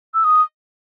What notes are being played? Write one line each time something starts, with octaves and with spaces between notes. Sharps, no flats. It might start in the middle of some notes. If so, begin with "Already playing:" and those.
E6
D#6